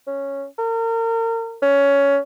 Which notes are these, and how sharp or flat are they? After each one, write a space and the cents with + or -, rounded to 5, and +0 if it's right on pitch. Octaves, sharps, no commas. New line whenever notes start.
C#4 -5
A#4 -35
C#4 +15